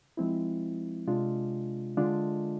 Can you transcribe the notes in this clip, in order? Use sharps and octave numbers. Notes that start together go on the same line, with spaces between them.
F3 G#3 C4 E4
C3 G#3 D4 F4
D3 G#3 D4 F4